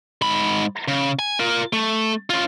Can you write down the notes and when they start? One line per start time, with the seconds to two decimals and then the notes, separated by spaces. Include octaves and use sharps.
0.22 G#2 B5
0.88 C#3
1.19 G#5
1.40 F4 A#4
1.73 A3
2.30 C#4 F4